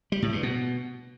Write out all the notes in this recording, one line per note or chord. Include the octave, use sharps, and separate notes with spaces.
G3
A2
G2
B2